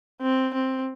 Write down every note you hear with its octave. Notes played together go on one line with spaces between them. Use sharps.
C4
C4